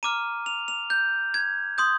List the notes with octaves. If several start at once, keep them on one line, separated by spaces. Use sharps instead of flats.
A#5 D6 F6 D#7
F7
F7
G6
G#6
C6 D#6 G6